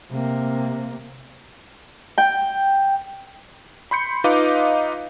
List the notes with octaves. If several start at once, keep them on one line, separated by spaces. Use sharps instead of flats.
C3 A#3
G5
B5 C6 G6 C#7
D#4 F4 B4 D#5 F5 D6